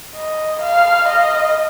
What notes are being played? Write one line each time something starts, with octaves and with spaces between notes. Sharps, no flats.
D#5
F5
D#5